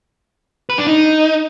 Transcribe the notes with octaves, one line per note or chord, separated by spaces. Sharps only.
B4
D4
D#4